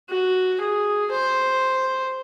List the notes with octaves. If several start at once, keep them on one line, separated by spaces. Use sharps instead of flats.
F#4
G#4
C5